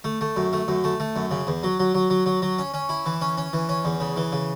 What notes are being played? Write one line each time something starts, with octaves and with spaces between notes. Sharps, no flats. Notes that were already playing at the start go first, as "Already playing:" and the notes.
A3
A3
F#2
A3
F#2
A3
A3
F#2
C#3
E2
F#3
F#3
F#3
F#3
F#3
F#3
C#4
C#4
E4
E3
C#4
C#4
E3
C#4
E2
C#3
E3
C#3